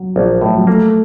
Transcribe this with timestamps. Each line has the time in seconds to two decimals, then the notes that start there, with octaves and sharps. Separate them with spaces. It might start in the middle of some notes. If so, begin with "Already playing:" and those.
Already playing: F#3
0.16 A#1
0.41 A2
0.47 F3
0.57 F#3
0.67 A3 A#3